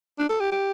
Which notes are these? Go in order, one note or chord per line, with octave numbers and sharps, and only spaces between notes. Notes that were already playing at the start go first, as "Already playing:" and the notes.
D4
A4
G4
G4